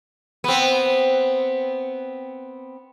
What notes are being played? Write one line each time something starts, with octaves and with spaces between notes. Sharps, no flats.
B3 C4